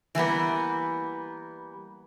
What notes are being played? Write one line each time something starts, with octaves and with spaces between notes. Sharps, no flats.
E3 G3 A#3 B3